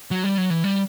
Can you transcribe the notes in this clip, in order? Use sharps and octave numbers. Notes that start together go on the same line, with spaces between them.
F#3
G3
F#3
E3
G3